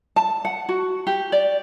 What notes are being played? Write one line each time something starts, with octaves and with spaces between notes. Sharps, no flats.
A5
F#5
F#4
G4
D5